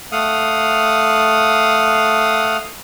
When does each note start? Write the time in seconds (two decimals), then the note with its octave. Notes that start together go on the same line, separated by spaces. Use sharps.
0.12 A3 F5 F#5 D#6